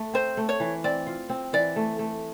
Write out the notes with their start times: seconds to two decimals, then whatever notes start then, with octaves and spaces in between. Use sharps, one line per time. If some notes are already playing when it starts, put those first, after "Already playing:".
Already playing: A3
0.14 C4 C5
0.37 A3
0.49 C#5
0.60 E3
0.84 C4 D5
1.07 F4
1.30 C4
1.53 E3 D5
1.76 A3
1.99 A3